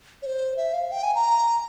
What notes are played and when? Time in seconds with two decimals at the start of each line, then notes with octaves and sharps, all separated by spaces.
0.22 C#5
0.26 C5
0.57 E5
0.74 F5
0.92 G5
1.03 G#5
1.15 A#5